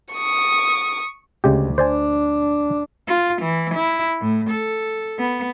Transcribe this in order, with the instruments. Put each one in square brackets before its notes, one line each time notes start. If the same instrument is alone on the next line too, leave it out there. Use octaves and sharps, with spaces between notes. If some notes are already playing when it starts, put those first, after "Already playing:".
[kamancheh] C#6 D#6
[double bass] D2 [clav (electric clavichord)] C#3 G#3 G4
[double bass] D4 [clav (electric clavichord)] C5 D5 G#5
[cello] F4
E3
E4
A2
A4
B3